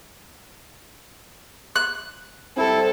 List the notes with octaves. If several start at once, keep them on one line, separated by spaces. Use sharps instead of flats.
F#6
G3 C4 E4 A4